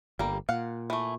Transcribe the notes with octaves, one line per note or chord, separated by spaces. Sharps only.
G1 G3 A#3
A#2 F5 F#5
E3 A3